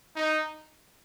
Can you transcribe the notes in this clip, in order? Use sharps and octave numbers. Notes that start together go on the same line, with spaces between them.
D#4